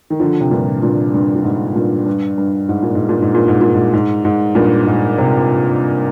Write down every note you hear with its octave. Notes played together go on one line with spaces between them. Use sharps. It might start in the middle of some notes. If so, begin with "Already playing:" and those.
D#3
D3 F3
C3
G2 A#2
G2 A#2
G2
A#2
G#2
G2 A#2
G2
G2
G#2
A#2
G#2
A#2
G#2
A#2
G#2
A#2
G#2
G#2
G#2
G2 A#2
G#2
C3